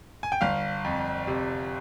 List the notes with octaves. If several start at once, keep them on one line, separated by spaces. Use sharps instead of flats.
G#5
G5
G1 F5
F2
C3